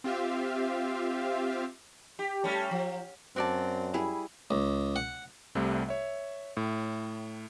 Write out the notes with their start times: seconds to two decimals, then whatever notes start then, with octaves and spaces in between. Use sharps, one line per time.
0.04 C4 F4 G4 E5 F5
2.19 G4
2.44 G3 A3 C#4
2.71 F3
3.36 F#2 C4 F#4 D5 A5
3.94 G3 E4 G#4
4.51 C#2
4.96 F#5
5.55 C2 C3 G3 A3
5.89 C#5 E5
6.57 A2